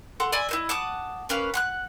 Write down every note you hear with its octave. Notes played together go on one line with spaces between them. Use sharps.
A4 F#5 C6
D5 E5 G#5 B5
E4 C5 D#5
F#5 A5 D6 D#6
A#3 C#4 B4 F5
F#5 C6 F#6